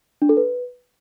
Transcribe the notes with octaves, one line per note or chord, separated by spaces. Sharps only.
D4
A4
B4